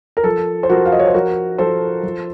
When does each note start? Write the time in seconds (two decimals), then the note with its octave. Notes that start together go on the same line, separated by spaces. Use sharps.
0.17 A#4
0.24 F3 A4
0.63 C5
0.69 F3 F#4 A#4
0.85 F5
0.92 D#5
0.99 C#5
1.07 C5
1.14 F3 F#4 A#4
1.58 F3 A4 C5
2.03 F3